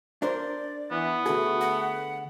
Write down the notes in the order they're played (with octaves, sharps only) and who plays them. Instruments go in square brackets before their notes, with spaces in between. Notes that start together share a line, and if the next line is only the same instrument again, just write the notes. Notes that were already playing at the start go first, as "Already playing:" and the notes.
[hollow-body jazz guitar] D4 A#4 C5 [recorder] D5
[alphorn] E3 [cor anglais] B3
[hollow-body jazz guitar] D3 G#4 [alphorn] A3 [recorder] F#4
[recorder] F#5